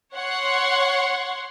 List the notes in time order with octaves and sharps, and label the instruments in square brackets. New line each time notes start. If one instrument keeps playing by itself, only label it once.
[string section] C#5 F#5 C6